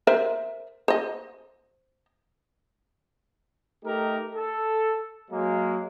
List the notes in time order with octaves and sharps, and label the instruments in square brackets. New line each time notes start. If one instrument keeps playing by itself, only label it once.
[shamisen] A#4 C5 E5
C5 D#5
[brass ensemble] A3 D#4 G4 A#4
A4
F#3 G#3 A#3